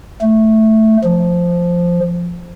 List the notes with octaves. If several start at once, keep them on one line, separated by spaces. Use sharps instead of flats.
A3
F3